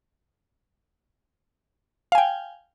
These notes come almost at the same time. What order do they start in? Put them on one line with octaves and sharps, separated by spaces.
F5 G#5 G5